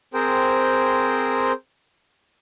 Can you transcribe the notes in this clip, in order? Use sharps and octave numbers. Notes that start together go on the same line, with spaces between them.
C4 G#4 A#4 C5 G5